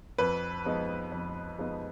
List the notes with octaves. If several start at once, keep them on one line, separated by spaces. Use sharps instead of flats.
F2 B4
F3 G#3 B3 D#4
F2
F3 G#3 B3 D#4